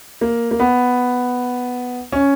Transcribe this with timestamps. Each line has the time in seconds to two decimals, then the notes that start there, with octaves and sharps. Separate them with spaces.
0.21 A#3
0.51 A#3
0.60 B3
2.12 C#4